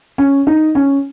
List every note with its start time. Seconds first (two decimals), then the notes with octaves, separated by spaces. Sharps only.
0.18 C#4
0.47 D#4
0.75 C#4